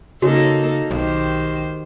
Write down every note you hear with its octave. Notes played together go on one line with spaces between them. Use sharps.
C#3 A#3 D#4 F#4 A4 C#5
B1 D#3 G4 C5